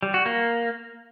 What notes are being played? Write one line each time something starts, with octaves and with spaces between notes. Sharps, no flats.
G3
F#4
A#3